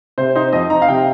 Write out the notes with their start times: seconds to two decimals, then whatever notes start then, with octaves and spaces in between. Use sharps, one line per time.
0.18 C3 C5
0.36 D#4 C5
0.53 F2 D#5
0.70 D#4 A#5
0.82 F5
0.88 C3 G5